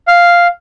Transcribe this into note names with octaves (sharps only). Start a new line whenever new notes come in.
F5